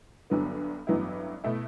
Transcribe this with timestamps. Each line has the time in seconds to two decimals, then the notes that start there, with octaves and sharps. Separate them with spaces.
0.30 G1 G2 D3 F#3 B3
0.87 A1 G2 F#3 B3 E4
1.44 B2 A3 E4